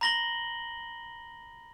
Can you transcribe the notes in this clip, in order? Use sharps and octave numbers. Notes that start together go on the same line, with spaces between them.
A#5 B5 A#6 F#7 G7